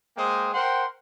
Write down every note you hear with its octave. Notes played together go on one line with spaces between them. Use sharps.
G#3 A#3 C5 G5 D#6
A#4 C5 F#5 G5 C6